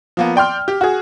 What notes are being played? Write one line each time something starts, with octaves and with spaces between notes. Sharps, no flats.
F3 A#3 B3
D5 G5 C6 F6
G4
F#4 G#4